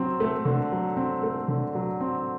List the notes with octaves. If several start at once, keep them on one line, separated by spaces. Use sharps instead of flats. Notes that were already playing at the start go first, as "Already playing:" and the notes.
Already playing: F#3 C4
A3
D3
F#3
C4
A3
D3
F#3
C4